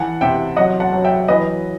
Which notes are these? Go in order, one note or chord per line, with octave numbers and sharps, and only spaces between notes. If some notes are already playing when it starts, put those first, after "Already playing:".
Already playing: E3 F#5 A5
C3 E5 G5
F#3 D#5 F#5
F#5 A5
F#3
E5 G5
E3 B4 D#5